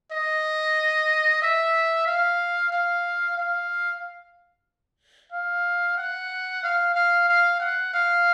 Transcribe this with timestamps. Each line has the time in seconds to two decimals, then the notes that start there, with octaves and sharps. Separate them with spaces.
0.12 D#5
1.42 E5
2.06 F5
2.72 F5
3.38 F5
5.32 F5
5.98 F#5
6.63 F5
6.95 F5
7.28 F5
7.60 F#5
7.93 F5